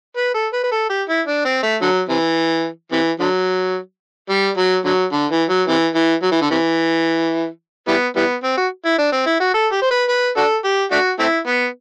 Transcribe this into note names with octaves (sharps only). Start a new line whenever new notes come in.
B4
A4
B4
B4
A4
G4
E4
D4
C4
A3
D3 F#3
C3 E3
C3 E3
D3 F#3
G3
F#3
D3 F#3
D3
E3
F#3
C3 E3
E3
F#3
E3
D3
C3 E3
E3 G3 B3
E3 G3 B3
C4
F#4
E4
D4
C4
E4
F#4
A4
G4
C5
B4
B4
D4 F#4 A4
G4
A3 D4 F#4
A3 C4 E4
B3